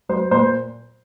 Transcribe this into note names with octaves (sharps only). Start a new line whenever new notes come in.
F#3 C5
A#2 C5